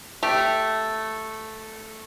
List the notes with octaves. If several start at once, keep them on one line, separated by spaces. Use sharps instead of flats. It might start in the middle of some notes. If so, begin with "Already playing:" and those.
A3 G4